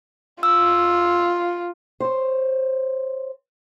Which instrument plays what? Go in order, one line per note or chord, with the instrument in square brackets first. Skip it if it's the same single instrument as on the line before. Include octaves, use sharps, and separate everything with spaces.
[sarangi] F4 [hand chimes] E6
[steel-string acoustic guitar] C5 C#5